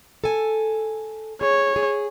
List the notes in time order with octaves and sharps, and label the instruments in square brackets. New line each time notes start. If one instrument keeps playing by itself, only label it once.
[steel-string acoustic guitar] A4 G#5
[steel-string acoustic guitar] G#4 [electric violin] C#5
[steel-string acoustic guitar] G#4